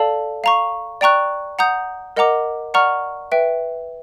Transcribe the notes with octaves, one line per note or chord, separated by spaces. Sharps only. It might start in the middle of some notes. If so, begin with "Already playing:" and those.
Already playing: A4 D5 F5 A5
F5 A#5 C#6
D5 G5 A#5 C#6 F#6
F#5 A#5 D#6 G6
A#4 D#5 F#5 A#5 D6
D5 F#5 A#5 C#6 F6
B4 E5 G5